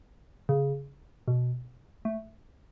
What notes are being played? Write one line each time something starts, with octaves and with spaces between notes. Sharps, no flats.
C#3
B2
A3